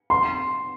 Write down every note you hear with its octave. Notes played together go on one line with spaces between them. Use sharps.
C6